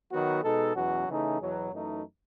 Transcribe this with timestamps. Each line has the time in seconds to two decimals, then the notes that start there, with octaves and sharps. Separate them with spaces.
0.12 D#3 F#3 B3 F#4
0.44 B2 G#3 D#4 A4
0.76 E2 B2 F#3 C#4 F#4
1.08 C#3 E3 A3 D#4 G#4
1.40 E2 B2 F#3
1.71 F#2 E3 A3 D#4